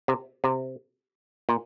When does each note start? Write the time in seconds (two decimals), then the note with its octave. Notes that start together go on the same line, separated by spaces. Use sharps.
0.08 C3
0.44 C3
1.49 A#2